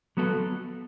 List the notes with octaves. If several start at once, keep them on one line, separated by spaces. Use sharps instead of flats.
F#3 B3 F#4 A4